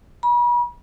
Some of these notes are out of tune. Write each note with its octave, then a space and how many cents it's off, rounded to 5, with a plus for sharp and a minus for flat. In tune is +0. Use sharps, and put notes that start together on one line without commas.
B5 -40